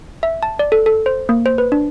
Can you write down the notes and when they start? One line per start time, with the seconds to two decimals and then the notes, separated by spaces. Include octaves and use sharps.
0.23 E5
0.43 A5
0.59 D5
0.72 A4
0.86 A4
1.06 C5
1.29 A#3
1.46 C5
1.58 B4
1.72 D4